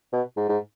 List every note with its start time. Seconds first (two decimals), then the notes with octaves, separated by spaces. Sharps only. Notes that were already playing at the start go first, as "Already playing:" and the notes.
0.13 B2
0.37 G#2
0.49 G#2